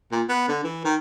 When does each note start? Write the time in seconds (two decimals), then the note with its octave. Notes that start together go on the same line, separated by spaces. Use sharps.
0.12 A#2
0.29 B3
0.48 D3
0.64 E3
0.85 D#3